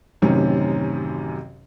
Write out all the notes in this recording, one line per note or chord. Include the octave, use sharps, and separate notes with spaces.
A1 F#2 C3 D#3 C4 C#4